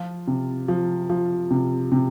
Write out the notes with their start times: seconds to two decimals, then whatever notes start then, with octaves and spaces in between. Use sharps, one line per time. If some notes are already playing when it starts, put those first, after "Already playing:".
Already playing: F3 F4
0.28 C3
0.68 F3
1.10 F3
1.51 C3
1.92 C3